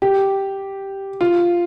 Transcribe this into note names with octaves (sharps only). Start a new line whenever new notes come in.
G4
F4